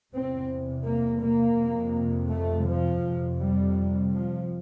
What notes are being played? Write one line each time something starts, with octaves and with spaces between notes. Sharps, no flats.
E2 C3 C4
A#3
A#3
F2 C3
A3
F3
F2 C3
G3
F3